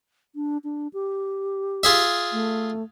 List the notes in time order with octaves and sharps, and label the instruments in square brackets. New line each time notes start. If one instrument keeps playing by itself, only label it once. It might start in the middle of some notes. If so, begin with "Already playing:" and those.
[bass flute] D4
D4
G4
[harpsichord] F4 G#4 E5
[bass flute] A3